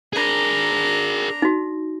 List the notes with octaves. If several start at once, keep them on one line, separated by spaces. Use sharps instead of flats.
D4 G#4 A#4 A#5
D#4 F#4